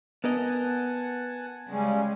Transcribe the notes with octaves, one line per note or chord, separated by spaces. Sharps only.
B3 A#4 D#5 F#5 G#5 A5
C#3 G3 G#3 C#4